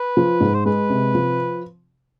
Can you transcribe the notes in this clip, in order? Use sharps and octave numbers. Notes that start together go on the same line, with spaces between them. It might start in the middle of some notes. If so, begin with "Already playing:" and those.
Already playing: B4
F3
G#2
C5
G#3 B4
C3
F3